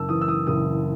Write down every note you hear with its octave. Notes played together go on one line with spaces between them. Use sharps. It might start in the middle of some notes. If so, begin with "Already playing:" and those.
Already playing: F#1 A5 E6
E3 D#6
E6
D#6
F#1 D#6